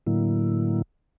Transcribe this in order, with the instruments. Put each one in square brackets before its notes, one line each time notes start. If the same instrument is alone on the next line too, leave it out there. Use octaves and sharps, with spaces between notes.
[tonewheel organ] A2 D3 F#3 A#3 E4